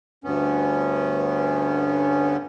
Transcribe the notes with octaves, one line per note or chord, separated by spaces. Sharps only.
D2 G2 B3 C#4